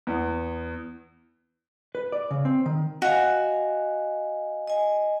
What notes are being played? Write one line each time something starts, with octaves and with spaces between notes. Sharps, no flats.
E2
B4
D5
C#3
C4
D#3
F#4 D#5 F5 G#5
D#5 G#5